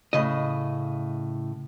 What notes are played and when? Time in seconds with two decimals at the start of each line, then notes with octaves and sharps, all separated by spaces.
0.13 A2 C#3 D#5